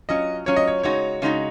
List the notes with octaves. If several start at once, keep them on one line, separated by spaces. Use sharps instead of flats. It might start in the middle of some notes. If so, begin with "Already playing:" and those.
F#3 C#4 F4 D#5
F#3 C#4 F4 C#5
D#5
C#5
C#3 G#3 D#4 F#4 C#5
C#3 G#3 D#4 F#4